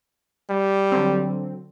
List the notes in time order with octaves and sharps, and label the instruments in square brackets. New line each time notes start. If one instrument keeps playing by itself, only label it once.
[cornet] G3
[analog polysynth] D3 F#3 C4